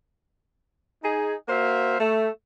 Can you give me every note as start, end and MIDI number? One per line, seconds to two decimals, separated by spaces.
1.03 1.34 63
1.03 1.34 68
1.48 1.98 58
1.48 1.98 66
1.48 1.98 72
1.48 1.98 76
1.48 1.98 77
1.99 2.29 57